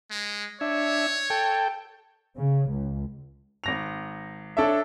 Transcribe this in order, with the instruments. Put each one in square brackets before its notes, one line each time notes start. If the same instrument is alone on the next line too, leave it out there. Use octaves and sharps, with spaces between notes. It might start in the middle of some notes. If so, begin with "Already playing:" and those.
[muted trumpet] G#3
[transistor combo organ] D4 E5 [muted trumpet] C#5
[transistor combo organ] A4 G5
[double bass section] C#3
C#2
[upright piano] G#1 A#6 F7
D4 A4 C#5 E5